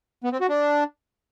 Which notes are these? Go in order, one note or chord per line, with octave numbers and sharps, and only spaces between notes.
B3
C4
F#4
D4